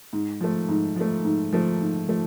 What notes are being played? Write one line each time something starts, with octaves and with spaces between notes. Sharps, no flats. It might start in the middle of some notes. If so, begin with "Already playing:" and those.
G#2
F3 A3
G#2
F3 A3
G#2
F3 A3
G#2
F3 A3